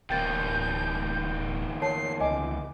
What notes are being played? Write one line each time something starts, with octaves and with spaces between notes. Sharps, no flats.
D1 E2 A#3 G5 G6 A6
A#4 C#5 A5 C7
C#2 D#5 G#5 D6